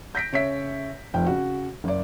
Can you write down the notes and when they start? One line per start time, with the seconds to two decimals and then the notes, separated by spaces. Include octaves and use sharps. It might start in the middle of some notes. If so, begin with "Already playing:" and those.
0.15 G6 A#6 B6 D7
0.33 C#3 C#5 E5 B6
1.14 F1 F3 G5
1.26 C#3 F#4
1.84 F#1 D5